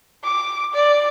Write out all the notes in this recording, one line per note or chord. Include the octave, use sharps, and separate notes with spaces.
D6
D5